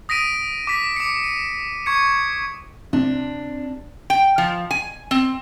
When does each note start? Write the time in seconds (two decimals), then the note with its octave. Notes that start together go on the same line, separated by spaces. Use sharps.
0.09 D#6 A#6 B6 D7 D#7
0.67 D6 B6
0.96 D6 C#7
1.23 D#7
1.86 C#6 G#6 C#7
2.93 C3 D4
4.10 G5
4.38 F3
4.71 G#5
5.11 C4